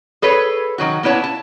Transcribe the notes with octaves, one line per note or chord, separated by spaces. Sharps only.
G#4 A4 B4 C#5
D#3 F#3 F#4
A#3 B3 E4 C#5 A5
A5